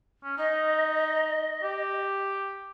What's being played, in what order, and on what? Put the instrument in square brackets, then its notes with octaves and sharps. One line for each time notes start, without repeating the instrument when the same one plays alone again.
[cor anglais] C#4
[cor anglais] D#4 [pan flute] D#5
[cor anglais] G4